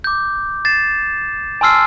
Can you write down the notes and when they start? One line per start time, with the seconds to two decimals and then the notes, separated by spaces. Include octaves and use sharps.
0.04 D6 G6
0.65 A6 C7 E7
1.61 G#5 A5 C6 E6 F6 C7